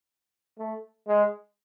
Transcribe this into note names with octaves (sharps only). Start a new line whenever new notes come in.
A3
G#3